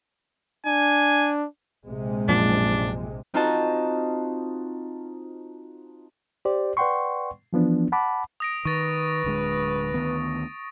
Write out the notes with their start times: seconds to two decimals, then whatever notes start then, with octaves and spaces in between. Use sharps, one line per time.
0.66 D4 G#5
1.86 A#1 C3 G#3
2.29 F#2 A#2 F3 D4
3.34 C4 D#4 F4 F#4 D#5 A5
6.45 G4 C5 D5
6.77 B4 D5 F#5 G5 C6 C#6
7.53 E3 F3 B3 D4
7.92 F#5 A5 B5 D6
8.40 D#6 A#6 D7
8.65 D#3 B4 C#6 A6
9.24 D1 D3 G#3
9.94 D2 D#3 B3